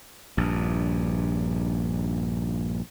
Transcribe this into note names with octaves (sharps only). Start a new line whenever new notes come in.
A#1 G2